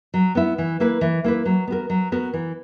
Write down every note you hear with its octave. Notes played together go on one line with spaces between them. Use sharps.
F#3
B3 E4
E3
A#3 E4 B4
E3
A#3 E4 B4
F#3
B3 F#4 A#4
F#3
B3 F#4 A#4
E3